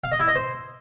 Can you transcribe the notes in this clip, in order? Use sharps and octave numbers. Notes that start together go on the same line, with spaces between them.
F5
D#5
E4
D#5
C5